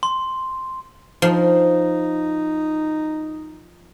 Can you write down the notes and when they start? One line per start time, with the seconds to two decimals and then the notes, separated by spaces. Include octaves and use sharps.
0.03 C6
1.22 F3 D#4